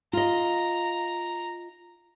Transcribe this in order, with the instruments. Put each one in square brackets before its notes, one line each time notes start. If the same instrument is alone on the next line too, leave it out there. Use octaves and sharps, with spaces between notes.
[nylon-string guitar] F4 D#5 [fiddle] A#5